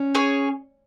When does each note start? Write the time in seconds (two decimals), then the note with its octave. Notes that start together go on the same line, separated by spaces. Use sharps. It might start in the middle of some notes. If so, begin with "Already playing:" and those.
Already playing: C#4
0.15 G#4 C#5 G#5